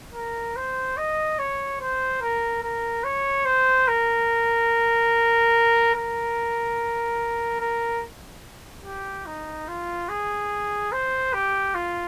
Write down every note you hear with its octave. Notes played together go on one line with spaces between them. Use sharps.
A#4
C5
D#5
C#5
C5
A#4
A#4
C#5
C5
A#4
A#4
A#4
G4
D#4
F4
G#4
C5
G4
F4